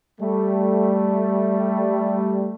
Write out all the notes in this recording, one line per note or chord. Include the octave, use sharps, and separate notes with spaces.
G3 A3